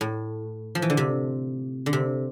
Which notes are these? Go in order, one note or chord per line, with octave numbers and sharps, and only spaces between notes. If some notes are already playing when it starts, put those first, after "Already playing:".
A2
F3
E3
D3
C3
D3
C3